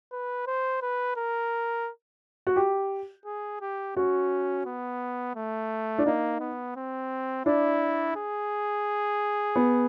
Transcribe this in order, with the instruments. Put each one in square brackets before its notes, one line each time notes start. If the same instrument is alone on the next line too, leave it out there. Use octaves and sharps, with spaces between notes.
[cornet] B4
C5
B4
A#4
[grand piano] F#4
G4
[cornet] G#4
G4
[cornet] C#4 [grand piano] F#4
[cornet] B3
A3
[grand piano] D4
[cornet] A#3 [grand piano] D#4
[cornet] B3
C4
[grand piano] D4 [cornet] E4
[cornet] G#4
[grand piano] B3